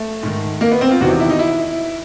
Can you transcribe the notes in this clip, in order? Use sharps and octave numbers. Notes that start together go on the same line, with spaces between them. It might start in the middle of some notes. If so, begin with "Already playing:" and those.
Already playing: A3
G#2 D#3
A#3
B3
C4
F4
E2 C3 D#3 F#4
E4
D#4
E4